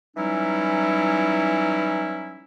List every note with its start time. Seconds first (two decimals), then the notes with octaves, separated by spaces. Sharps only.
0.17 E3 F#3 G3 C#4 D#4 E4